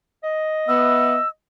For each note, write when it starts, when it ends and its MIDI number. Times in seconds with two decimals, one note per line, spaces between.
0.24 1.26 75
0.68 1.17 59
0.68 1.17 76
0.68 1.28 88